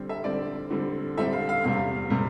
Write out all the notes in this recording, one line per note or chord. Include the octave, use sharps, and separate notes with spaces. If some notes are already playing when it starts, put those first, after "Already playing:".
Already playing: D3 G3 C4
E5
D3 G3 C4 D5
D3 G3 C4
D3 G3 C4 E5
F5
F5
E2 C3 G3 F5
C3 G3